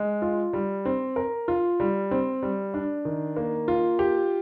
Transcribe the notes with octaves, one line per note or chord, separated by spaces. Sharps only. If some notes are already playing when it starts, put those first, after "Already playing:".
Already playing: G#3
F4
G3
C4
A#4
F4
G3
C4
G3
D4
D#3
A#3
F4
G4